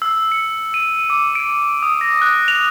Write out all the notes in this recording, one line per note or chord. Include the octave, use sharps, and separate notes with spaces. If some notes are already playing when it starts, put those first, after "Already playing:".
E6
C#7
D#7
D6
D7
D#6
A#6
F#6
F7